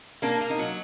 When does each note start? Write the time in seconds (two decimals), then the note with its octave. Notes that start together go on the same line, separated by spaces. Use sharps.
0.22 A#3 D4
0.41 A#3
0.50 D#4
0.59 F#3